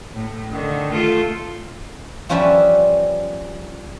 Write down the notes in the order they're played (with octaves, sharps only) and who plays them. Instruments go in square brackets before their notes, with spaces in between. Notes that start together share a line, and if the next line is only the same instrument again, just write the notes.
[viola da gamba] A2
D3 D#3
A3 F4 A4
[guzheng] F3 G3 C#4 B4 D5 E5